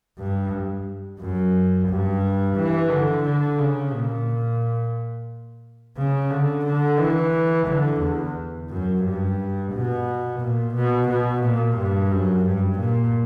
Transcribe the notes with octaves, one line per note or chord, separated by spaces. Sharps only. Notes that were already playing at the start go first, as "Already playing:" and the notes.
G2
F#2
G2
E3
D3
D3
C#3
A#2
C#3
D3
D3
E3
D3
E2
F#2
G2
B2
A#2
B2
B2
A#2
G2
F#2
G2
A#2